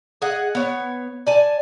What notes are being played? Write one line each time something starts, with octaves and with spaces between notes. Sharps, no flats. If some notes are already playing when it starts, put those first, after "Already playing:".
G#4 D#5 F#5
B3 C#5
D5 G#5 A5